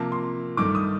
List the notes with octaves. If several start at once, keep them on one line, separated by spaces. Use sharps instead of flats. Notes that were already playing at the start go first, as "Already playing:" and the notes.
Already playing: C3 F3 A#3 A5
C6
G2 D#3 A3 D6
D#6